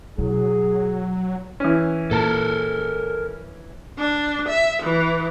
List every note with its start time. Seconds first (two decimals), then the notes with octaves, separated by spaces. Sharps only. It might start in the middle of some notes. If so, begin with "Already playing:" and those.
0.18 B2 F#3 E4 G#4
1.60 E3 C#4
2.11 A#2 A4 A#4
3.98 D4
4.47 E5
4.82 E3